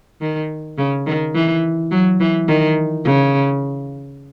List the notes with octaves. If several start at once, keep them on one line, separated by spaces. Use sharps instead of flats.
D#3
C#3
D#3
E3
F#3
E3
D#3
C#3